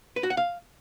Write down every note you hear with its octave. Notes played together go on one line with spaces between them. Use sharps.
B4
F#4
F#5
F5